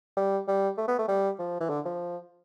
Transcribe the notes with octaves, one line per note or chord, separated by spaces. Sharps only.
G3
G3
A3
B3
A3
G3
F3
E3
D3
F3